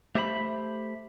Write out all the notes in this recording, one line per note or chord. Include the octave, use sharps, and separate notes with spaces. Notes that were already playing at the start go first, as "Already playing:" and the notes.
A3 G4 C5 E5 A#5 B5